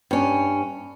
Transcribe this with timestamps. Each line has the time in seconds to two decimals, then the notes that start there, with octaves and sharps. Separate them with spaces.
0.11 G2 C#4